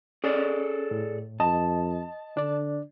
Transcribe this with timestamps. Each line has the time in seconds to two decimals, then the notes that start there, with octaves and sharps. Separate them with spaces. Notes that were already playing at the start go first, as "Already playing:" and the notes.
0.24 C#4 G#4 A4 D5
0.91 A2
1.40 F2 D#5 A5
2.37 D3 D4 D5